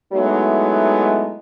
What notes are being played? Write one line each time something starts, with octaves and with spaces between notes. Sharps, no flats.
F#3 G#3 A3 B3 D#4 E4